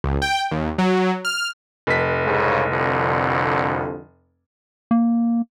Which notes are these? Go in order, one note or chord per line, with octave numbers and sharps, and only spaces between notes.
C#2
G5
D#2
F#3
F6
F1 B6
C2 G#2 C#3
C2 F2 D3
A#3